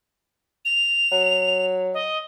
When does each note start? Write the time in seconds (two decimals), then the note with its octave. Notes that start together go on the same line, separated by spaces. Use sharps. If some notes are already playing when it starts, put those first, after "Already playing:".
0.65 F7
1.12 F#3
1.94 D#5